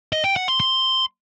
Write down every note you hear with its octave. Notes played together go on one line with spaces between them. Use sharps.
D#5
G5
F#5
C6
C6